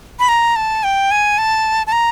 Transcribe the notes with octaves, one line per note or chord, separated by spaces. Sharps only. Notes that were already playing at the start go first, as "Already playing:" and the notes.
B5
A#5
A5
G5
G#5
A5
A5
A#5